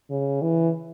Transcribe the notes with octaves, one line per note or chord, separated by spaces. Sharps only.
C#3
E3